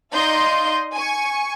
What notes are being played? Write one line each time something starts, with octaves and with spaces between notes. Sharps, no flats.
D#4 D5 D#5 F5 C6 G6
G#5 C#6